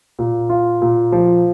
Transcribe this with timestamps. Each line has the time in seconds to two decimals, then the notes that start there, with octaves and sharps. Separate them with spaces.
0.19 A#2
0.49 F4
0.82 A#2
1.12 F3